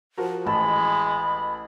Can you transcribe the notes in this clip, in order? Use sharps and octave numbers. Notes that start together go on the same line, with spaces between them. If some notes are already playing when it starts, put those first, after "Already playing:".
F3 F#4 A#4
A1 G#3 A5 B5